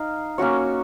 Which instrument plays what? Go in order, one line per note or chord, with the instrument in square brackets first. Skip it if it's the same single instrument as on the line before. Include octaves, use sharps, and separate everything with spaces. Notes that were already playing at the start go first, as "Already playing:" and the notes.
Already playing: [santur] D#4 F5
A#3 C#4 F#4 C#5